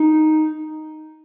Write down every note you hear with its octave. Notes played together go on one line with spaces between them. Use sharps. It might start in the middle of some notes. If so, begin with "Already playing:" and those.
Already playing: D#4